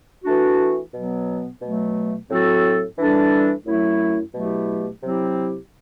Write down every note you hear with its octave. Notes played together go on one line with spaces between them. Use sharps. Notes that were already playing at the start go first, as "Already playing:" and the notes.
E3 A3 D4 F#4
B2 F#3 B3
B2 F#3 A3
A2 F#3 C4 F#4 A4
E3 G3 D4 A4
F#2 F#3 A3 E4
B2 F#3 A3 E4 G4
C3 F#3 C4 E4 G4